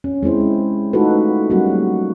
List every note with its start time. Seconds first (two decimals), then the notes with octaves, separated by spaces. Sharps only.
0.04 C#4
0.23 G#3 C4 E4 C5
0.93 A3 D#4 F4 F#4 A4 B4
1.50 F#3 G3 A#3 C#4 F#4